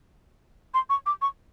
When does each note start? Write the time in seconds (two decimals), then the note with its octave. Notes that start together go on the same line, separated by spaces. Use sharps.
0.74 C6
0.90 C#6
1.06 D6
1.22 C#6